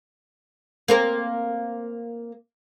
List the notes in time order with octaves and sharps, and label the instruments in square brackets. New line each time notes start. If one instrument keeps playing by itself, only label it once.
[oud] A#3 C4 A#4